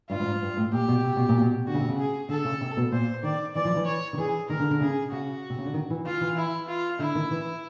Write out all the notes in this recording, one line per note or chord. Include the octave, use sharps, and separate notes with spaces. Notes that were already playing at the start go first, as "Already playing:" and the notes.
G2 F4
G2
G#2
G2
A2
A#2 G4
B2
C3
B2
A#2
B2
D3 F#4
C#3
C3
C#3
G#4
D3 A4
C#3
C3
B2
A#2 C5
D#3 D5
E3 D5
F3
E3
C#5
D#3
E3 G#4
D#3 A#4
D3
D3
C#3 G#4
C#3 F#4
C3
C#3
D3
D#3
E3
E3 F4
E3
E4
F4
D3 E4
D#3
E3